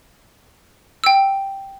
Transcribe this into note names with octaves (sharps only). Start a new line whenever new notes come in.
G5 E6